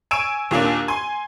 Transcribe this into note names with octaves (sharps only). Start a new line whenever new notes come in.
G#5 C#6 E6 D7 E7
D#2 A#2 A#3 D4
G#5 C6